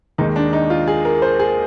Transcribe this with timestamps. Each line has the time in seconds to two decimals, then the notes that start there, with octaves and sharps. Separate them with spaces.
0.18 D#2 D#3 G#3 D#4
0.36 D4
0.53 D#4
0.70 F4
0.87 G#4
1.05 A#4
1.22 C5
1.39 G#4